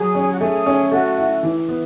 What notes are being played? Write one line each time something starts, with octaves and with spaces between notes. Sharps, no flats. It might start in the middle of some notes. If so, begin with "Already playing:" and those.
Already playing: F#3 G#4
C#4
F#4
A3 G#4
C#4
A3 F#4
E4
E3
B3